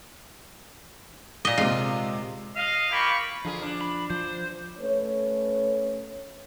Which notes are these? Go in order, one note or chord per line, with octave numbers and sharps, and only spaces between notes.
A#2 D#5
C3 G#3 F4
D#5 F5
A#3 F4 G4 B5 C#6
D3 F3 F4 G#4
D4
B5
F3 C5
A3 C#4 B4 C#5